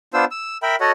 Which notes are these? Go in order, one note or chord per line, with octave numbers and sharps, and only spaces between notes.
B3 D4 F4 C5 E6
E6
A#4 E5 G5 B5
F#4 A4 C#5 D#5 F#5